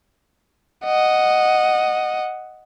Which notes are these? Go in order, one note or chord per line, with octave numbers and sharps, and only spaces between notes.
D#5 F#5